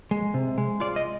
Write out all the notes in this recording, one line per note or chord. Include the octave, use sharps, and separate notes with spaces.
G#3
C3
G#3
F4 D5
D#5